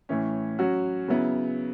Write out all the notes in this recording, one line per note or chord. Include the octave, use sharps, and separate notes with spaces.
A2 E3 C#4
F#3 C#4 F#4
C#3 F#3 B3 E4